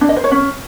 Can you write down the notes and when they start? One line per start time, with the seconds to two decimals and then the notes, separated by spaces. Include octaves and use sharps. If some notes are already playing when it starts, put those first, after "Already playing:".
0.01 D4
0.09 D#5
0.16 C5
0.24 C#5
0.32 C#4